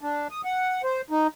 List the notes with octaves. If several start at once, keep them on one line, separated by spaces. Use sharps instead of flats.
D4
D#6
F#5
C5
D#4